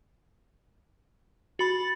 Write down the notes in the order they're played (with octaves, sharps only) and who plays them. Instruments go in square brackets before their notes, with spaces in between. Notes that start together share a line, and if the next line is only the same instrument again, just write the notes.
[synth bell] F#4 B5 [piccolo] A6